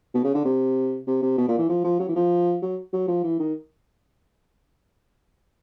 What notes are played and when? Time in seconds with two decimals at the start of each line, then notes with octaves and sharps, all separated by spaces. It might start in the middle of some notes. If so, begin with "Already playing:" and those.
0.14 B2
0.24 C#3
0.35 D3
0.45 C3
1.07 C3
1.22 C3
1.38 B2
1.48 A#2
1.58 E3
1.69 F3
1.84 F3
1.99 F#3
2.09 E3
2.15 F3
2.62 F#3
2.93 F#3
3.08 F3
3.23 E3
3.39 D#3